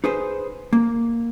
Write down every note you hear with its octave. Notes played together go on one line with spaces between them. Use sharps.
D#4 G#4 B4 C5
A#3